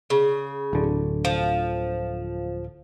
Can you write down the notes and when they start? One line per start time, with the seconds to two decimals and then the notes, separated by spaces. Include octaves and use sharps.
0.10 C#3
0.73 D1 D3
1.25 F3